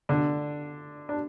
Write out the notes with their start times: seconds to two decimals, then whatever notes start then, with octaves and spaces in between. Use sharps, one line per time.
0.09 D3 D4
1.09 D4